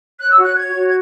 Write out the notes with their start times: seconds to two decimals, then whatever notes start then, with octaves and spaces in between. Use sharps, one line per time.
0.19 C#5 F#6
0.31 E6
0.38 F#4 F#6
0.56 C#5 G#6
0.75 F#4
0.87 G#6